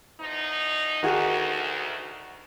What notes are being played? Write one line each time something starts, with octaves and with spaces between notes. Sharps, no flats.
E2 F3 D#4
D2 D#3 F#4 G#4